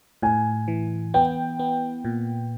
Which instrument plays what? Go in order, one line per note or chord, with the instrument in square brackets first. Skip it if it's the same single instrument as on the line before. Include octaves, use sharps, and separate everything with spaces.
[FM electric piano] A2 [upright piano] G#5
[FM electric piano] E3
[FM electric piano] B3 [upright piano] G5
[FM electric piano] B3
A#2